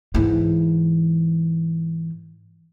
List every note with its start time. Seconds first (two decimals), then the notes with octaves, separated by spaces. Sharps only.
0.15 G#2 E3